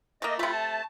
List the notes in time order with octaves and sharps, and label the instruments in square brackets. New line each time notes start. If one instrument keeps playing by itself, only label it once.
[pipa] A3 A#3 [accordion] D#5
[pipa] C3 A3 [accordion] F4 B5
[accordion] A5